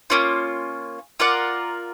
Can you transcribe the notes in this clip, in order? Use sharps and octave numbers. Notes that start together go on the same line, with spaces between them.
A#3 C#4 F4
F4 A#4 D5 F#5